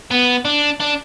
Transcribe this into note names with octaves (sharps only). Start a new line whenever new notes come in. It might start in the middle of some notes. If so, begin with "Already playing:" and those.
B3
D4
D4